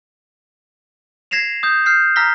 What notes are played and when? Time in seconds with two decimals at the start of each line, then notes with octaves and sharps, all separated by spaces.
1.31 G#6 A#6 C7 E7 F7
1.63 D#6 G6
1.86 F6 G6 C7
2.16 A#5 E6 F6 A#6 B6 G7